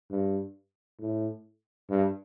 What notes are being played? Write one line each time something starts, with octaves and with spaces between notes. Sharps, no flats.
G2
A2
G2